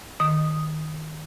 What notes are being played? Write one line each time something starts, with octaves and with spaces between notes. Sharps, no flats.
D#3 D#6